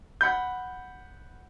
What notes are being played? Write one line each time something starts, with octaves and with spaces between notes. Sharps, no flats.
F#5 B5 G6